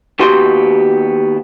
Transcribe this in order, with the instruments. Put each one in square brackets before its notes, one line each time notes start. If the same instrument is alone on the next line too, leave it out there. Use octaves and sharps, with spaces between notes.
[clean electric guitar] D#2 B3 F#4 G4 C6